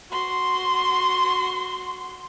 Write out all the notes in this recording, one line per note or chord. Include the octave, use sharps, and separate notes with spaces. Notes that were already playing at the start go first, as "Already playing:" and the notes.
F#4 C6